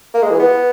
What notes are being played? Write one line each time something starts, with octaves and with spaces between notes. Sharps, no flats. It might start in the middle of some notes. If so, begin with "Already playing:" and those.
A#3
G#3
E3
B3